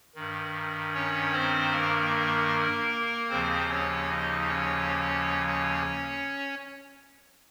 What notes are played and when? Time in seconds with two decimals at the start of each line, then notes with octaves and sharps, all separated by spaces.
0.15 G2 D#3
0.94 C#4 C#5
1.33 C4 C5
1.72 A#3 A#4
3.30 D#2 C#3 F3 C4 C5
3.69 C#4 C#5
4.09 D#4 D#5
4.48 C#4 C#5